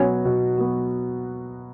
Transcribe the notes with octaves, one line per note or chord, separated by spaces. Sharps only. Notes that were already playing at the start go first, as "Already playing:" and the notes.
Already playing: B2 F#3 B3 C#4 F#4
B2
F#3 B3 F#4